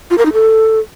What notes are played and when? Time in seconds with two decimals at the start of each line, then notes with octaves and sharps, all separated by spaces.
0.10 F4
0.18 A#4
0.25 D#4
0.33 A4